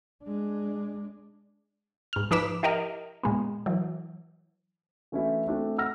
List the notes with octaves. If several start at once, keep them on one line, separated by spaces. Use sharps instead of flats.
G#3 D4
G#2 F6
F3 D#4 B4 D6 B6 E7
E4 G4 A#4 D#5 F6
A#2 G#3 B3
E3 F#3
E3 A3 C#4 D4 E4 F#4
A3 C4 D4 F#4
F#5 E6 F6 A#6